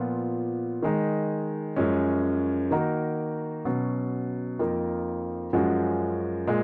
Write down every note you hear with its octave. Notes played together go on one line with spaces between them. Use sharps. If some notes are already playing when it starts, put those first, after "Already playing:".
Already playing: A#2 F3 B3 F4
D#3 G#3 D#4
F#2 F3 G#3 C#4
D#3 A#3 D#4 F#4 A#4
B2 F#3 C#4
F2 F3 A#3 D#4 A#4
F#2 F3 G#3 C#4 F#4
A#2 G#3